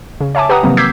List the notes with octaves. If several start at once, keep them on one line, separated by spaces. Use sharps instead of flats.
C#3
C#5 E5 G#5 A5 D6
G4 B4 F#5 G5 A#5 D#6
C3 D#3 F3 F#3 A#3 C4
D6 E6 G6 G#6 B6 C7